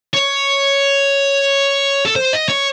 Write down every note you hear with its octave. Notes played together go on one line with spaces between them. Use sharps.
C#5
A4
C5
D#5
C#5